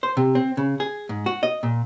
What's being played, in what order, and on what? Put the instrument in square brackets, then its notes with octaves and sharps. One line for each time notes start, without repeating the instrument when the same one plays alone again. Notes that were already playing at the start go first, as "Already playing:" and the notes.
[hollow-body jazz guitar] C5
C3
C4
C#3
G#4
G#2
F#4
D#5
A#2